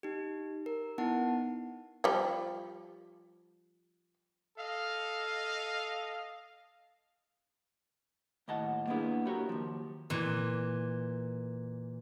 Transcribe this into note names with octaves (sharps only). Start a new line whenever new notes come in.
D#4 G4
A#4
B3 D#4 E4 F#5 A5
F3 G3
A4 D#5 F5
D#2 A2 D#5 F#5 A5
A#3 B3 D4 E4 G#4
F#4 G4 A#4 C#5
D#2 F3
A#2 E3